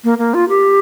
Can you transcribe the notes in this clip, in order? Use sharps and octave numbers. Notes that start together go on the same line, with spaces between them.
A#3
A#3
F4
G4